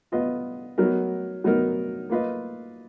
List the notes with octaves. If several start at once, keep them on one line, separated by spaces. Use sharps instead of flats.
B3 F4 B4 D#5
F#3 B3 D#4 A#4
F#3 B3 D#4 A#4
A#3 F4 B4 D#5